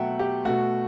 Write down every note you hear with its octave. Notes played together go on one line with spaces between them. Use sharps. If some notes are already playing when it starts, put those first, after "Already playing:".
Already playing: B2 F#3 A3 E5 F#5 G5
G4
B2 A3 F#4